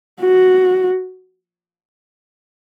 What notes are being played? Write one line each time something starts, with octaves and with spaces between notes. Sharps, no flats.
F#4